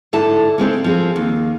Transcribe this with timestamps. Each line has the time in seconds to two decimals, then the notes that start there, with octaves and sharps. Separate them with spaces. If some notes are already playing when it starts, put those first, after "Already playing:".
0.13 G#2 D3 E4 A4 A5
0.58 C#3 G#3 C4 D#4
0.84 F3 C4 G#4
1.16 D#2